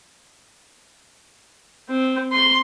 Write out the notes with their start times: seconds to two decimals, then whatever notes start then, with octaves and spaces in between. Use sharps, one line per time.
1.88 C4
2.32 C6